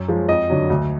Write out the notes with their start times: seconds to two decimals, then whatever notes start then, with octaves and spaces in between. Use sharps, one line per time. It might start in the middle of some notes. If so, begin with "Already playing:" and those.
Already playing: F#2
0.08 F3 G#3
0.28 F2 D#5
0.50 D3 F#3
0.70 D2